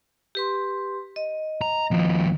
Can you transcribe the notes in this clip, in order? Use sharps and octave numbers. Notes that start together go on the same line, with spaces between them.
G4 B4 C6
D#5
A#5
D#2 F3